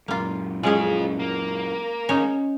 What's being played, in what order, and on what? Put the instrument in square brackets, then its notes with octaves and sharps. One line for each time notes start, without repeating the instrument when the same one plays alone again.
[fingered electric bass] F#2 A#2 [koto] A#3 F4
[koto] G#3 C#4 G#4 [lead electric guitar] C4 F4
[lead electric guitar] A#3
[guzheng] C#4 [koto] D#4 C#5